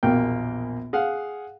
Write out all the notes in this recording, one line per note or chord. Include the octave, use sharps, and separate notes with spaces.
A#1 E2 B2 A#3 G5
G#4 F5 F#5